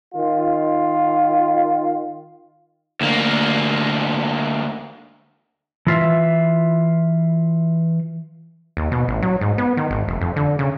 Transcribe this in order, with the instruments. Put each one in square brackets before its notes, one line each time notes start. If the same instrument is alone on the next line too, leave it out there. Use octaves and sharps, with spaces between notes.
[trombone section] D#3 F4
[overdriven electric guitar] D2 A#3
[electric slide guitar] E3 F4 E5
[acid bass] D#2
B2
A1
F#3
G#2
B3
D#3
G#1
F1
F2
D3
C#3